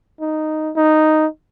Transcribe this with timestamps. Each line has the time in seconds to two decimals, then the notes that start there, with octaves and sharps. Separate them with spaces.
0.21 D#4
0.76 D#4